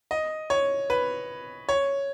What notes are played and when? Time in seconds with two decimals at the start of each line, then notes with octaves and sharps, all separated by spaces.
0.11 D#5
0.50 C#5
0.90 B4
1.69 C#5